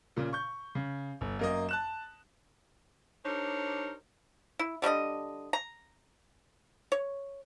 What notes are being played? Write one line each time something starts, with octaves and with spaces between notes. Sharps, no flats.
A#2 C#3
C#6 G6
C#3
G1
F#2 A#3 D#5
A5 F#6 E7
D4 D#4 G4 A#4 C5 C#5
E4
D3 G3 D4 D#5
A#5
C#5